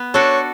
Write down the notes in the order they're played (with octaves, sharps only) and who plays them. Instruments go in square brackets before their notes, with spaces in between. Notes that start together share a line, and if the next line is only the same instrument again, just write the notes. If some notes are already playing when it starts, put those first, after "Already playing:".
Already playing: [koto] B3
[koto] D4 F#4 A4 [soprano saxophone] C#5